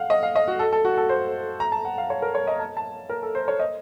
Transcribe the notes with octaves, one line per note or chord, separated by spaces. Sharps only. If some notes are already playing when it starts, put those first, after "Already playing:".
Already playing: F5 F#5
D#5
F5
D#5
F#4
A4
A4
F#4
A4
C5
A#5
A5
F#5
F5
C#5
A#4
C#5
D#5
A5
A5
A#4
A4
C5
C#5
D#5